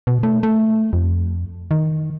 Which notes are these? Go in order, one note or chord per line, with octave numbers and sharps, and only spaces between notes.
B2
A3
A3
F2
D#3